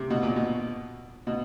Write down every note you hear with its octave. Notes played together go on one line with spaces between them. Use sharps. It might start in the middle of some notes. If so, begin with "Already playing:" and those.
Already playing: C3
B2
A#2
B2
B2